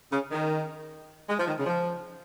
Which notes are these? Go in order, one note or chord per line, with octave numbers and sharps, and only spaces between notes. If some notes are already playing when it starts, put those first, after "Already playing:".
C#3
D#3
G#3
F3
D#3
C#3
F3